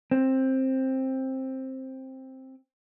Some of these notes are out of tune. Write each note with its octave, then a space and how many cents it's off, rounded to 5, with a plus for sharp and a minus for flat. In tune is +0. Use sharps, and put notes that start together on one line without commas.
C4 +10